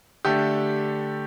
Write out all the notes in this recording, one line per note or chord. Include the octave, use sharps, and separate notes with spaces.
D3 A3 D4 G4